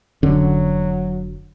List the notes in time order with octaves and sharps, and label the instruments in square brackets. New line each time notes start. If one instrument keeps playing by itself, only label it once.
[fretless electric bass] F1 D3 C#4 [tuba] F#3